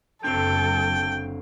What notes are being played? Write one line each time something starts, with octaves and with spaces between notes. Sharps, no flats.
F#1 F#2 D3 C4 A4 G5